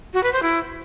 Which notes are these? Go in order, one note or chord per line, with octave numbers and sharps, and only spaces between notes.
F#4
B4
C5
E4